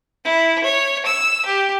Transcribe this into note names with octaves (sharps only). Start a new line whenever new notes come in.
E4
C#5
E6
G4